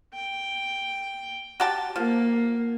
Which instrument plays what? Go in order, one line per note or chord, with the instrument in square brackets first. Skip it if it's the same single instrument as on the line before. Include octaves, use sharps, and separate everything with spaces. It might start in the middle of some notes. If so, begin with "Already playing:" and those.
[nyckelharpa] G5
[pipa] F#4 G4 A5
[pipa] F3 [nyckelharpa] A#3